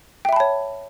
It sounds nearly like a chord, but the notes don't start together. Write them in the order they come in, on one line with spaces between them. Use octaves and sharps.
G5 E5 B5 A5 C#5